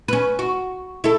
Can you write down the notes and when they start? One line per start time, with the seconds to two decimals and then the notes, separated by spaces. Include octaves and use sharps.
0.08 C#4 B4
0.39 F#4
1.04 E4 A4